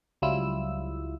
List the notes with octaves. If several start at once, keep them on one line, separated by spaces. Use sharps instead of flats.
C#2 F#3 G3 E4 F4 E6